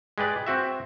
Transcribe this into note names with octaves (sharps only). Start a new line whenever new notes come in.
G#3 G4 B4 D5
C4 F#4 E5